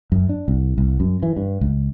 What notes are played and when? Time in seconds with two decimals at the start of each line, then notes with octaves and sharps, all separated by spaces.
0.12 F#2
0.29 D4
0.48 C2
0.78 C2
1.00 F#2
1.23 E3
1.37 G2
1.61 C#2